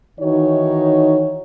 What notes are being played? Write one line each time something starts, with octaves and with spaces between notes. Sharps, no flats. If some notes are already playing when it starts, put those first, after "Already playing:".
D#3 E3 D#4 F#4 C#5